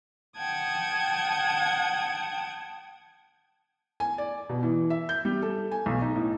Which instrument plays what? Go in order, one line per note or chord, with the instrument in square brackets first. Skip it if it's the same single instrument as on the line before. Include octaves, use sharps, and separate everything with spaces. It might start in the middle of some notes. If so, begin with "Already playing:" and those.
[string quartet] F#5 G5 A5 D#6 G#6
[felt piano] G#5
D5
B2
E3
E5
G6
G3
A4
G#5
B1
D#4
A2